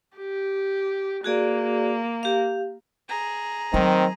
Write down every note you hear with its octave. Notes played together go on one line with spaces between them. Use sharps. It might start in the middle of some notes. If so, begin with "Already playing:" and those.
G4
A#3 F#4 G#4 D5
G4 F5
G#4 A#5
D#3 F#3 A3 C4